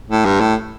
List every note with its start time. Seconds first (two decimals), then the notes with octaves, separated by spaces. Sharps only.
0.10 A2
0.25 G2
0.41 A2